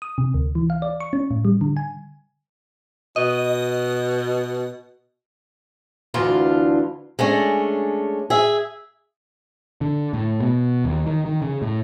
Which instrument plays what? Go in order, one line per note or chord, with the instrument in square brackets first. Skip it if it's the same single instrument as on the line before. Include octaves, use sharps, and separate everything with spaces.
[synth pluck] D#6
C3
D2
E3
F5
D5
C#6
C#4
A2
G3
D3
G#5
[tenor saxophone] B2 [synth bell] D#5
[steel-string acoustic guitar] D2 D3 E3 F4
G#3 A3 C#4 D4
G#4 E5
[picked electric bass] D3
A2
B2
D#2
D#3
D#3
C#3
A2